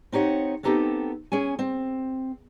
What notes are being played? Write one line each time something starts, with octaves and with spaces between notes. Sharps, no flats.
C4 D#4 G4 C#5 F#5
B3 C4 D#4 G4 A4
C#4 G#4 G#5
C4